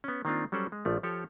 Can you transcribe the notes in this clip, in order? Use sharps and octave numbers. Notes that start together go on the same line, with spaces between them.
B3 C#4
D#3 A#3 C4 D4 F4
F#3 G3 C#4 A4 C5 D5
G#3
A#1 F3 A3
F3 G4 A4 C#5